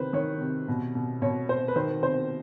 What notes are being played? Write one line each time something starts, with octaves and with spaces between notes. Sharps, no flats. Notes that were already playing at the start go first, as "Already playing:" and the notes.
Already playing: C3 D#3 B4 C5
D#3 C#5
C3
B2
B2
B2 C#5
B2 C5
B4
D#3 C5
C3 C5